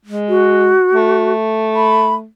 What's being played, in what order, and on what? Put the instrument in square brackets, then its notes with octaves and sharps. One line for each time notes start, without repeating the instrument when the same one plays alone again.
[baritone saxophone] G#3
[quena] F#4
[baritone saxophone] A3
[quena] B5